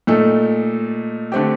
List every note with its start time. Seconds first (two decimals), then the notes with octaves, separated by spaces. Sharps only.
0.07 A#2 A3 D#4 A4
1.32 D3 A3 C4 G4